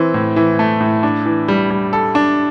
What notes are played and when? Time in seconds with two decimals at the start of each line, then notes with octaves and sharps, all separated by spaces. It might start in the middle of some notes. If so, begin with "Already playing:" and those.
Already playing: E3 C4
0.14 A2
0.36 E3
0.59 A3
0.81 A2
1.03 D4
1.26 E3
1.48 G3
1.70 G3
1.93 A4
2.15 D4